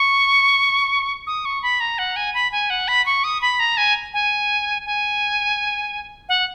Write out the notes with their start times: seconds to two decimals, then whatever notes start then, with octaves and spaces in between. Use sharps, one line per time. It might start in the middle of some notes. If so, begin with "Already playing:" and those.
Already playing: C#6
1.27 D#6
1.45 C#6
1.63 B5
1.80 A#5
1.98 F#5
2.16 G#5
2.34 B5
2.52 G#5
2.70 F#5
2.88 B5
3.06 C#6
3.24 D#6
3.42 B5
3.60 A#5
3.77 G#5
4.13 G#5
4.86 G#5
6.29 F#5